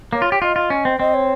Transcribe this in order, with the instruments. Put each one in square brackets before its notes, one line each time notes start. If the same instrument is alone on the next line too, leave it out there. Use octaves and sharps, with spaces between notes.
[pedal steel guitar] A#3 [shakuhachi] C#5
[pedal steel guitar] F4
G4
[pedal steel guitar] F4 [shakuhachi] D#5
[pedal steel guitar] F4
C#4
C4
[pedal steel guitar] C4 [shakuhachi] D#5
[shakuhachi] C#5